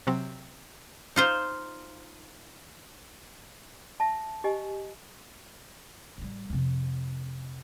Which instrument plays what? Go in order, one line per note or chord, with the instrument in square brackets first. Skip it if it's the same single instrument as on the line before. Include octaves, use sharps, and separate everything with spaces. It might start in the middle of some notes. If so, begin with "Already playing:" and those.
[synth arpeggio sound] C3 F#3 C4
[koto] D#4 F4 C5
[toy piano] E5 A5
G4 D#5 G#5
[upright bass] A1 G3
F2 C3